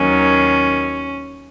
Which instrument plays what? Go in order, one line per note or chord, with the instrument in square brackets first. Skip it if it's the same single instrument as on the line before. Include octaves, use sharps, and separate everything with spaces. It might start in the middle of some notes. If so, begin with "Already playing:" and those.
Already playing: [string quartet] D#2 D#3 F#3 C#4